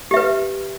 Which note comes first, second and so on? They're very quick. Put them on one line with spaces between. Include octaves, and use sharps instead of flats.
G4 E5 B4